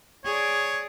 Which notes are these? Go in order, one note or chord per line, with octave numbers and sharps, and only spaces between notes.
G#4 C#5 D5